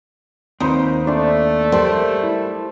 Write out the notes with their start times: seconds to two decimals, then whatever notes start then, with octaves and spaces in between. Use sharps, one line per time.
0.60 D#2 C4 D#4 B4 C5
1.07 A3 D4 D5 C6
1.72 G3 A#4 C5 D5 A5
2.23 E4